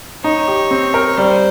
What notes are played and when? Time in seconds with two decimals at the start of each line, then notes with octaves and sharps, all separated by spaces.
0.24 D#4 C#5
0.48 G4
0.71 C4
0.94 A#4
1.17 G3 C5